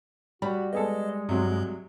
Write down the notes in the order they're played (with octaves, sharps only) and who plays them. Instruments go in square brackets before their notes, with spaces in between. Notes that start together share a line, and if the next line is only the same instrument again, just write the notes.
[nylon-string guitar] G3 [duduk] F#4 [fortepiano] B5
[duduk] G#3 [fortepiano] B3 G#4 A4 [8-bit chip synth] D#5
[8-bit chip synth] G2 [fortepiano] C3 F#3